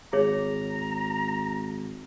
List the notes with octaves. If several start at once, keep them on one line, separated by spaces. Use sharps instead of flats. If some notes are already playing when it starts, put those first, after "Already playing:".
G#1 G#4 C#5 A#5